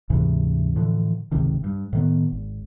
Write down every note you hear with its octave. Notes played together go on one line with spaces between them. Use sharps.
D2 G#2 C3 E3
A2 D3 E3 F3
G#1 C#2 C3 D#3
G2
A2 D#3 B3
G#1